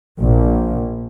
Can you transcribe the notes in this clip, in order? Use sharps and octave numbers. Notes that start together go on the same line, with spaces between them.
A#1